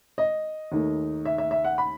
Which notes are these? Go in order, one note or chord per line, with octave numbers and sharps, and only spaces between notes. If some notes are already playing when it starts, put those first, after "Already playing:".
D#5
D#2 D#3 A3
E5
E5
E5
F#5
B5